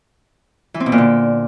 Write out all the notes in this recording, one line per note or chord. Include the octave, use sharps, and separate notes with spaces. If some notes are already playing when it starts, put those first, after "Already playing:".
E3
C4
B2
A#2
D3